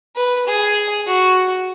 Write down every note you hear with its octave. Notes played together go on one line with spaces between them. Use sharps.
B4
G#4
F#4